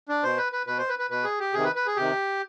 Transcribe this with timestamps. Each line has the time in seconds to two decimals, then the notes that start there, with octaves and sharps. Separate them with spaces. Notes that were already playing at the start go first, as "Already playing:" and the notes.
0.09 D4
0.23 B2 C5
0.38 B4
0.52 B4
0.66 B2 B4
0.78 C5
0.89 B4
0.99 B4
1.10 B2 B4
1.24 G#4
1.39 G4
1.53 C3 D#3 G#4
1.64 B4
1.75 B4
1.86 G#4
1.96 C3 D#3 G4